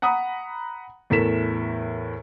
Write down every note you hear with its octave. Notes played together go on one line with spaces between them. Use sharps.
F#5 A#5 B5 D#6
E2 A2 A4 A#4 B6 E7